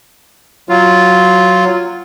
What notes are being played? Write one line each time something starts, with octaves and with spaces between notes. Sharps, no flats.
F#3 F4